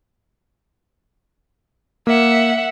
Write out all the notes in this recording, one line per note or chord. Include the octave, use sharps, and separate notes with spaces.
A#3 E5 F#5